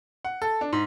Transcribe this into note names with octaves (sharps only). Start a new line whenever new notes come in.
F#5
A4
D4
G#2